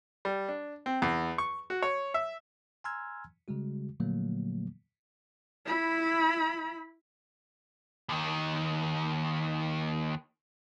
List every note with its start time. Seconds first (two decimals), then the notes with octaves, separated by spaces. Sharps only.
0.25 G3
0.49 D4
0.86 C4
1.02 E2
1.38 C#6
1.70 F#4
1.82 C#5
2.14 E5
2.84 G#5 A#5 C6 E6 F6 G#6
3.48 C#3 G3 G#3 F#4
4.00 A#2 D3 F3 F#3 A3 A#3
5.66 E4 B5
8.09 D#2 D#3